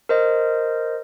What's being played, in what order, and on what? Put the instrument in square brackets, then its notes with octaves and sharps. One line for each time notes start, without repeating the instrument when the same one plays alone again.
[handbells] A#4 C5 D#5